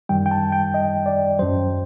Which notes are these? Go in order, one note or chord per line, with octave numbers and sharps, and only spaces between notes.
F#2 D#3 G3 G5
G5
A5
G5
D#5
D5
F#2 F#3 C5